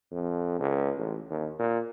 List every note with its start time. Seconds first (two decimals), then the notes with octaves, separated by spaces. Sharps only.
0.12 F2
0.60 C#2
0.98 A1
1.30 D#2
1.59 A#2